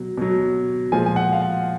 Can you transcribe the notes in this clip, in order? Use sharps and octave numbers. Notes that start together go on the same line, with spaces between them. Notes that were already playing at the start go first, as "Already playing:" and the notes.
Already playing: B2 F#3
B2 F#3
A#2 F3 G#3 G#5
G#5
F#5
F5
F#5